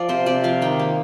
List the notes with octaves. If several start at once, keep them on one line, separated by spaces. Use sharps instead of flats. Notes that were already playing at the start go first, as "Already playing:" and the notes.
Already playing: F3 D5 F5
C3 C5
C3 D5
F3 F5
D#3 G5
A#3